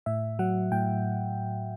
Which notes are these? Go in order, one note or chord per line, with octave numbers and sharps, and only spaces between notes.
A2 E5
F#3 F#5
A2 G5